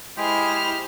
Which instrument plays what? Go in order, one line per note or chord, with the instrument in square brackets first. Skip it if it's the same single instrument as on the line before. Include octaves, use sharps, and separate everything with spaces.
[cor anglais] G#3 [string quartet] E4 [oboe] G4 [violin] C5 F6